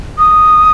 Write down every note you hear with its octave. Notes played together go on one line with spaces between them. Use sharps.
D#6